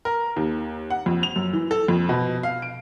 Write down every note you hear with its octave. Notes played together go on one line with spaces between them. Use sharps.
A#4
D#2
F#5
F2
F7
F#2
E3
A4
F2
B2
F5
D7